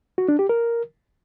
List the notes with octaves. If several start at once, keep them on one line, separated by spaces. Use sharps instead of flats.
F#4
D4
G4
A#4